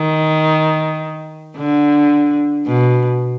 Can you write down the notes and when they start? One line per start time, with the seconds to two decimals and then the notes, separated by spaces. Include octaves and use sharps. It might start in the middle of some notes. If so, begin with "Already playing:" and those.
Already playing: D#3
1.57 D3
2.67 B2